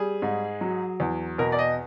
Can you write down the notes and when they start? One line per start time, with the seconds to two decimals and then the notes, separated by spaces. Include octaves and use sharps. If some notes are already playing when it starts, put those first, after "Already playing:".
Already playing: G3 G#4
0.22 G#2
0.61 F#3
1.00 E2
1.38 B2 A#4
1.52 D5
1.59 D#5